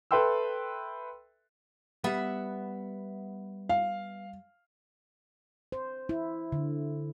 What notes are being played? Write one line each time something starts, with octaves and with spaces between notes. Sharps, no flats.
A4 B4 E5 G5 C6 E6
G3 B3 E5 F#5
F5
C5
E4
D3